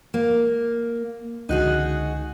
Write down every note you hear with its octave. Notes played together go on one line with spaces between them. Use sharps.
A#3
C#2 D3 D#4 F#4 G#4 F#6